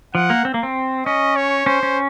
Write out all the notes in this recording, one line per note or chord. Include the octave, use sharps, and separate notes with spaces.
F3 F#5
A#3
C4
A#3
C4
C#4 D#5
C#5
C#4 C5
C#4